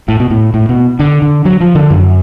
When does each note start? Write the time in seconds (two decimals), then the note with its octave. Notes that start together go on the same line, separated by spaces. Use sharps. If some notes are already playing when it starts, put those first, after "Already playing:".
0.08 A2
0.20 B2
0.30 A2
0.54 A2
0.69 B2
1.00 D3
1.22 D3
1.45 F#3
1.61 F3
1.75 D3
1.90 F#2